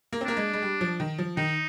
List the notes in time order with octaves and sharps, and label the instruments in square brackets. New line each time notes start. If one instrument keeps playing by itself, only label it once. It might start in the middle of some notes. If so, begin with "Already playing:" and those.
[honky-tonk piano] A#3
C4
[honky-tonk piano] A#3 [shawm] D4
[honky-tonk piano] G#3
G#3
G3
F3
D#3
F3
[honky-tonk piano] D#3 [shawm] D#4